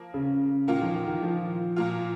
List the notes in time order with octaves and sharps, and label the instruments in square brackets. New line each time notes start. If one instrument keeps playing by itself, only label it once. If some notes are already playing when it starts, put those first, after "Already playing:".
Already playing: [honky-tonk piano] F3 A#3
[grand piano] C#3
[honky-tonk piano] A#2 A#3 F4 [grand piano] D#3
[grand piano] F3
D#3
D#3
F3
[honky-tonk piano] A#2 A#3 F4